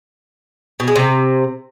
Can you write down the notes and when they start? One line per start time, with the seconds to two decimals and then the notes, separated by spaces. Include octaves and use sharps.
0.80 B2
0.88 G#3
0.96 C3